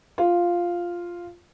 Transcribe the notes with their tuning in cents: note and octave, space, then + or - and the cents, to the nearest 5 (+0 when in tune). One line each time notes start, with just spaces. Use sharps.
F4 +0